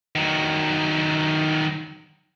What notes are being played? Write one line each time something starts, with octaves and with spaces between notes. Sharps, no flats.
D#3 F#3